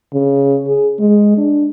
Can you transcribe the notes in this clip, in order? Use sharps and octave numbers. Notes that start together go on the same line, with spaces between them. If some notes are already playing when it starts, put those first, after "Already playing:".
C#3
G#4
G#3
D4